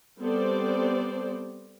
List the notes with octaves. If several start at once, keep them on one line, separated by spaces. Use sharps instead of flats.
G3 B3 C4 A4 C5 D5